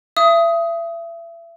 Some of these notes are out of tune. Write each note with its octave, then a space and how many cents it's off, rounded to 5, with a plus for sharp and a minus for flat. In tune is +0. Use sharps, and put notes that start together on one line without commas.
E5 +35 D#6 +15